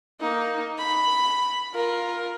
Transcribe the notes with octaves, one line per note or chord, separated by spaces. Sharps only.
A#3 D#4
B5
F4 A#4